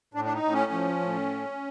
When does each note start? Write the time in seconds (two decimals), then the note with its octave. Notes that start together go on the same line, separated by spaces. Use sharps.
0.14 A2 D4
0.24 D4
0.34 D#4
0.43 A2
0.52 C#4
0.72 F3
1.00 A2